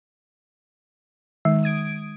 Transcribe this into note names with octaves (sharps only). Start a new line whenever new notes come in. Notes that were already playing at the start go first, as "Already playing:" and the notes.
D#3 G#3
D#6 G#6 D7